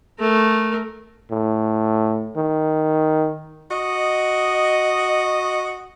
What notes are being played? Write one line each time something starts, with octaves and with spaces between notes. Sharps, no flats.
A3 A#4
A2
D#3
F#4 D#5